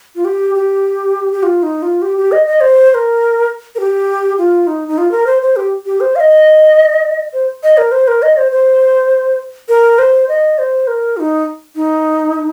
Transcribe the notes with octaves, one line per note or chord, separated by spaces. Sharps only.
F4
G4
G4
G4
F4
D#4
F4
G4
G4
D#5
D#5
C5
C5
A#4
A#4
G4
F4
D#4
D#4
F4
A#4
C5
C5
G4
G4
C5
F5
D#5
C5
D#5
A#4
C5
A#4
D#5
C5
C5
A#4
C5
D#5
C5
A#4
F4
D#4
D#4